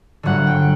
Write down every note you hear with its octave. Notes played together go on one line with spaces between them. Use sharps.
G1 G2 D3 F#3 F#5
G5